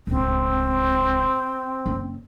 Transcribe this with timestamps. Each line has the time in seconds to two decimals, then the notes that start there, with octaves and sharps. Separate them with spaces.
0.07 D1 C#2 C4
1.86 F#1